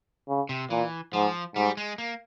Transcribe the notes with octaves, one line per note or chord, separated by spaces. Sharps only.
C#3
C3
A#2 E3
G#2 F3
G#2 G3
G#3
A#3